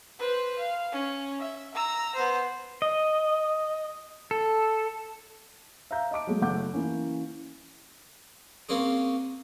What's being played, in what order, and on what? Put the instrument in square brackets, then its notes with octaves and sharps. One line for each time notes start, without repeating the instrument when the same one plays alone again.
[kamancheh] B4 C5
F5
C#4
E5
A#5 E6
B3 C5
[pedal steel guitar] D#5
A4
[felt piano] E5 F5 A#5 G6
D#5 A5 D6 D7
F#3 G#3 A3
F#1 F#3 A3 F#5 D6 G6
E3 A#3 C#4
[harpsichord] A#3 C4 C#4 G#4